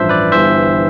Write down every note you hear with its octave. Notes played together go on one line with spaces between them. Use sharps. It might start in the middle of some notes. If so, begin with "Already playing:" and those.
Already playing: A1 G2 F3 C5 E5
B4 D5
G1 G2 E3 C5 E5